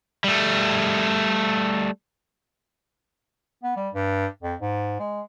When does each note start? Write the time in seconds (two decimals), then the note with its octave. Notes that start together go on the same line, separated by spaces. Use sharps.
0.24 G3 A3
3.63 B3
3.76 G3
3.94 G2
4.42 F2
4.60 G#2
5.00 G#3